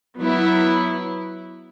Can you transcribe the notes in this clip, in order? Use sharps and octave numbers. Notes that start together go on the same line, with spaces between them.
F#3 B3 E4